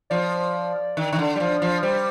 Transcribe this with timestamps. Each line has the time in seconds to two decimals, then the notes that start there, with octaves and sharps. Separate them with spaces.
0.10 F3 D5
0.97 D#3
1.13 D#3
1.19 D3
1.36 G3
1.40 F3
1.62 F3
1.83 G3 C5